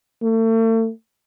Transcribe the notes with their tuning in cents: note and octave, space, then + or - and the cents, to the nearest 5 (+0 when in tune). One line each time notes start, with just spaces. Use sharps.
A3 +40